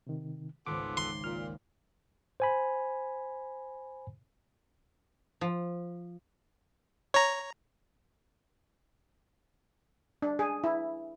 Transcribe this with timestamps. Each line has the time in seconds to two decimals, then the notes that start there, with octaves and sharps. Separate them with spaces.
0.07 C3 D#3
0.67 G#1 C#2 B3 F4 A4 D6
0.97 C6
1.24 A#2 F6
2.40 C5 G#5 B5
5.41 F3
7.14 C#5 A#5
10.22 D4
10.39 G#4
10.64 E4